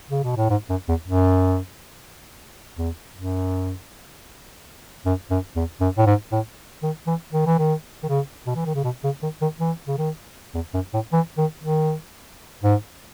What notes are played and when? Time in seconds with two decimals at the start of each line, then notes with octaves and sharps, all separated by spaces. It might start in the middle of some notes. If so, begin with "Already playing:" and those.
0.10 C#3
0.23 B2
0.36 A2
0.50 G#2
0.70 F#2
0.89 E2
1.07 F#2
2.78 E2
3.16 F#2
5.06 F#2
5.30 F#2
5.56 E2
5.81 F#2
5.97 A2
6.06 G#2
6.32 A2
6.83 D#3
7.07 E3
7.32 D#3
7.46 E3
7.58 D#3
8.03 D#3
8.08 C#3
8.46 B2
8.55 E3
8.65 D#3
8.74 C#3
8.84 B2
9.04 C#3
9.23 D#3
9.41 D#3
9.60 E3
9.87 C#3
9.98 D#3
10.54 E2
10.74 F#2
10.93 A2
11.13 E3
11.38 D#3
11.63 D#3
12.63 G#2